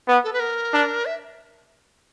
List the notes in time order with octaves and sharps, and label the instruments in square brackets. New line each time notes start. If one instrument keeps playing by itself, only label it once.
[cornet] B3
[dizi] A4
B4
A#4
[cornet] D4
[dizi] E5